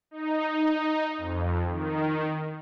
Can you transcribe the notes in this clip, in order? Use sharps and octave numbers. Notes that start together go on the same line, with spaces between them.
D#4
F2
D#3